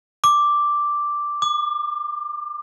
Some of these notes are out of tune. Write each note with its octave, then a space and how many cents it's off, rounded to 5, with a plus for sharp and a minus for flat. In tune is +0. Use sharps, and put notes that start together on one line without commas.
D6 +0
D6 +35